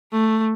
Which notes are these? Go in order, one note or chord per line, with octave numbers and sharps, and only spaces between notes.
A3